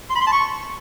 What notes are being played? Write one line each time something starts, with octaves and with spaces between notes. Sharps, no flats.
C6
B5
C6
A5
C#6